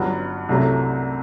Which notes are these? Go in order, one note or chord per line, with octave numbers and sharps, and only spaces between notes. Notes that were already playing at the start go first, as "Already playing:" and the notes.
Already playing: G1 G2 F#3 F#5
C2 C3 F#3 A3